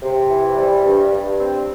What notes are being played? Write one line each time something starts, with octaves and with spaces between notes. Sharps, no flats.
C3
E3
G3
G2
G2
C4